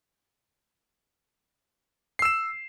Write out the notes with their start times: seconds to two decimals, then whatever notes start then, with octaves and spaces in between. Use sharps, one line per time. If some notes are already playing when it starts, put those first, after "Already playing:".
2.19 C7
2.22 E6
2.25 E7